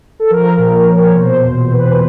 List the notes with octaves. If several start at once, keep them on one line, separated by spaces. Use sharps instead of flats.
A4
F3 A#4
A#2
A#2 C#5
B2 C5
E2
E2 B4